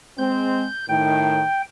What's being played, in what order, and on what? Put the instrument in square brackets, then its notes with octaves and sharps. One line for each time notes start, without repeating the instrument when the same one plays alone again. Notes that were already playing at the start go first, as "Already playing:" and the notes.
[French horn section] G#3 C4 [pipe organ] G6
[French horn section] A2 D#3 [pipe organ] G5